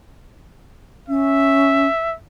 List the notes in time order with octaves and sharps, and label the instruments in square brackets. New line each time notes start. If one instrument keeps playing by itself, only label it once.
[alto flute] C#4 [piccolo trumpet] E5